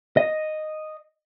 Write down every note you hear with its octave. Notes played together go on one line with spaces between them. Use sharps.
D#5